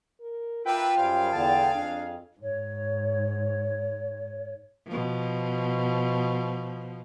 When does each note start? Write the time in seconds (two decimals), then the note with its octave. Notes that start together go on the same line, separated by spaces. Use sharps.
0.20 A#4
0.66 D4 F4 A#4 B4 E5 G5
0.97 F#2 G3 G#4 C5 F5
1.32 E2 D3 A5
1.74 F2 D4
2.41 G#2 C#5
4.87 B2 F3